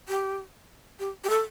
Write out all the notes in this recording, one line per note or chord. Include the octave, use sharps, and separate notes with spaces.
G4
G4
G4
A4